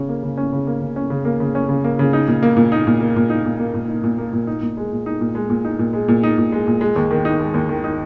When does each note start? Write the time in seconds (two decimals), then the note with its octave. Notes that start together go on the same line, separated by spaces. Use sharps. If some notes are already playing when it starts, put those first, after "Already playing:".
Already playing: C#3 C#4
0.09 A#3
0.23 C#3
0.37 C#4
0.52 C#3
0.67 A#3
0.81 C#3
0.96 C#4
1.10 C#3
1.25 A#3
1.40 C#3
1.55 C#4
1.69 C#3
1.84 A#3
1.99 C#3
2.13 D#4
2.28 A#2
2.43 A#3
2.56 A#2
2.72 D#4
2.87 A#2
3.01 A#3
3.16 A#2
3.30 D#4
3.45 A#2
3.60 A#3
3.74 A#2
3.88 D#4
4.04 A#2
4.18 A#3
4.33 A#2
4.47 D#4
4.62 A#2
4.77 G#3
4.92 A#2
5.06 D#4
5.21 A#2
5.35 G#3
5.50 A#2
5.65 D#4
5.79 A#2
5.93 G#3
6.08 A#2
6.23 D#4
6.38 A#2
6.52 G#3
6.67 A#2
6.81 G#3
6.96 D#2
7.11 D#3
7.25 D#4
7.40 G#3
7.54 D#2
7.69 D#3
7.84 D#4